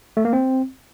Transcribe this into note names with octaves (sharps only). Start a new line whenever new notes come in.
A3
A#3
C4